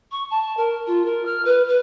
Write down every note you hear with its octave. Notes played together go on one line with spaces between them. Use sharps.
C#6
A5
A#4
F4
A#4
F6
B4
B4